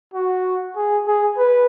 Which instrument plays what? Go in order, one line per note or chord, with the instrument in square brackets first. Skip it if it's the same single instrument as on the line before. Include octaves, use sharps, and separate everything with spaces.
[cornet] F#4
G#4
G#4
B4